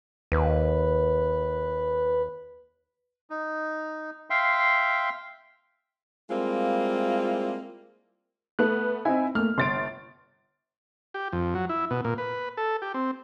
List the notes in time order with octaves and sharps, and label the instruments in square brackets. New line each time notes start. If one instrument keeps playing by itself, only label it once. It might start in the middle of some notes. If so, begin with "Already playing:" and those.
[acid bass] D#2 [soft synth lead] B4
[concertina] D#4
E5 F5 G5 C6
[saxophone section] G3 G#3 A#3 C4 E4 F4
[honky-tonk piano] A3 B3 [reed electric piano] F#6
[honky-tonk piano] C4 D#4 E4 [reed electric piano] G#5
[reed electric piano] A3 A#3 [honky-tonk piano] F6
[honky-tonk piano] G1 A6 D7 [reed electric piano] C6
[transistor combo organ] G4
F2
F#3
E4
B2
A#2
B4
A4
G4
C4